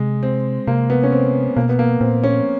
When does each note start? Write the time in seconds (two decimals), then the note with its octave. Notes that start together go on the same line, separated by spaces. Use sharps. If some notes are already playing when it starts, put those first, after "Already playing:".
Already playing: C3 G#3
0.23 C4
0.67 C3 A#3
0.90 B3
1.03 C#4
1.12 C4
1.56 B2 A#3
1.69 B3
1.79 A#3
2.01 A#2 C4
2.24 C#4